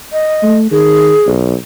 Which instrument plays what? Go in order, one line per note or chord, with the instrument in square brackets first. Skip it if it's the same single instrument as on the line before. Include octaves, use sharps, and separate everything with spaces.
[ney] D#5
[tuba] A3
[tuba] D#3 [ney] G#4
[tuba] B1